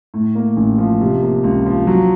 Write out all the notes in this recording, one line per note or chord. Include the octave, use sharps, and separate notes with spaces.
A2
A#3
A1
F3
C3
A#3
C#2
F3
F#3